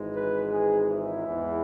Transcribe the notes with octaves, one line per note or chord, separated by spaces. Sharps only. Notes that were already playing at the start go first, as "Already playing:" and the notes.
Already playing: G#1 G#2 E3 G#3
B4
G#4
E4
E2 E3 G#3